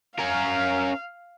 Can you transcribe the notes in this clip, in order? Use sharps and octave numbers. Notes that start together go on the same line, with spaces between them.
C#4 A#4 F5